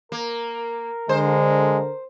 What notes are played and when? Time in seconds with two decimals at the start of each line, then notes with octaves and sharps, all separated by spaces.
0.12 A#3 A#4
1.09 D3 G#3 C5